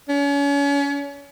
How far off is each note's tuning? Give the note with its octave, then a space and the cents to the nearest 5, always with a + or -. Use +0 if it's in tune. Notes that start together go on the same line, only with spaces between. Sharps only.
C#4 +35